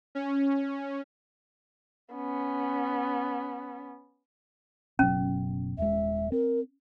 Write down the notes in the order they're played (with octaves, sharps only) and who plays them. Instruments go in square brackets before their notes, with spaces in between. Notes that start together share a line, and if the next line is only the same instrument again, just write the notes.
[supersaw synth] C#4
[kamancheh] B3 C#4
[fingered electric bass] F#1 B2 F#3 [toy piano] C#4
[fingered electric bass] D#1 G#3 [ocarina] E5
[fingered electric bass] C4 [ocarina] A#4